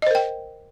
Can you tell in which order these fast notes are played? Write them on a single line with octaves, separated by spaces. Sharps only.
D#5 C5 A#4 G5